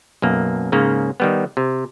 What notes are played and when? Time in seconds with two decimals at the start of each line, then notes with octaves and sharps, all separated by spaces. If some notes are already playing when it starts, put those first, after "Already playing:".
0.22 B1 F#2 A#3
0.72 G#2 C#3 A#3 C#4
1.20 D#3 G3 B3
1.57 C3